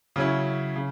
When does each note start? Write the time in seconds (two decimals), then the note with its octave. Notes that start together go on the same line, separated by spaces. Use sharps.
0.16 C#3 F#3 C#4 E4
0.76 C#3